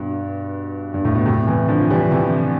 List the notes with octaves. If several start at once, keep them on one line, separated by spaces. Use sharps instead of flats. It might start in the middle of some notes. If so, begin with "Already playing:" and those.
Already playing: G2 B2
G2
A2
B2
A2 C3
C3 E3
D3 F3
E3 G3
C3 E3